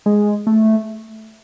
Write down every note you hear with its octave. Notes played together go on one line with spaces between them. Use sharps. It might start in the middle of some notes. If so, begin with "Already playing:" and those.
G#3
A3